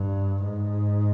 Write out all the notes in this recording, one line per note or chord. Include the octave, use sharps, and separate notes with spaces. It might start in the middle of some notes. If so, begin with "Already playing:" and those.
Already playing: G2
G#2